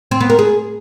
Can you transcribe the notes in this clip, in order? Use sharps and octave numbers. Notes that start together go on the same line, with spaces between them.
C4
B3
A#4
G#4